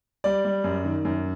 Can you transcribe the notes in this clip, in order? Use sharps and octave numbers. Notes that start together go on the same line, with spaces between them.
G3 D5
G3
F#2
D#3
F#2